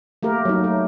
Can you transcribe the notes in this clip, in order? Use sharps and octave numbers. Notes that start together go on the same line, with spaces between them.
A3 A#3 G4 A#4
F#3 D#4
A3